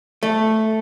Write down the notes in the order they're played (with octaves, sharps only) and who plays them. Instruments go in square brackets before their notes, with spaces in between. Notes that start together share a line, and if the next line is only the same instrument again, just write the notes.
[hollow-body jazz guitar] A3